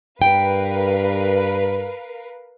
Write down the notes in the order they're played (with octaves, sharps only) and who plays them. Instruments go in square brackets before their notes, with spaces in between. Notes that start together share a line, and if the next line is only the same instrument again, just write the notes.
[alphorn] G2 [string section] A#4 B4 F5 [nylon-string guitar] G5